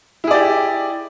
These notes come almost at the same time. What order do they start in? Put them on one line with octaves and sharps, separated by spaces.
E4 G#4 D5 G4